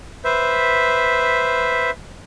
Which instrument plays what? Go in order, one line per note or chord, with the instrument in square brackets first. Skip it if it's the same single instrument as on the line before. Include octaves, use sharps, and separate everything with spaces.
[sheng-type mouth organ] B4 C5 E5